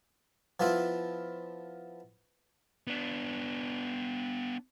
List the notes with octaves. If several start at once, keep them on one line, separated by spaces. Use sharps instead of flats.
F3 B3 E4 F4
B3 D4